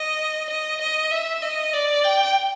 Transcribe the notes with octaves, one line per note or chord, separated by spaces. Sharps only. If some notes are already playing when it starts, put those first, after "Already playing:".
Already playing: D#5
D#5
D#5
E5
D#5
D5
G5